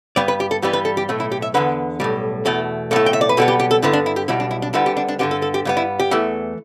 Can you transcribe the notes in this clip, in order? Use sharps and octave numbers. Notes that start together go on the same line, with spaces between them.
G2 G3 B3 D5
B4
G4
A4
G2 E3 G3 B3 G4
B4
A4
G4
B1 A2 A3
E4
G4
E5
E2 D3 B3 B4
B1 A2 G3
E2 B2 A3 A4
B1 A2 A3 A4
G5
E5
D5
B4
B1 B2 G3 B3 A4
G4
G4
A4
G2 D3 B3 E4
D4
E4
G4
B1 B2 G3 E4
D4
E4
D4
D2 D3 G3 B3 E4
G4
D4
D4
G2 D3 B3 G4
A4
A4
G4
G2 G3 B3
E4
G4
E2 E3 A3